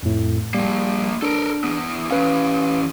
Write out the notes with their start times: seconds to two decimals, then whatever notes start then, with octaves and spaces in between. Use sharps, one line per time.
0.03 F2 A2
0.54 F3 G3 A#3
1.22 D4 A4 A#4
1.64 E2 B3
2.11 E3 C#4 B4 F5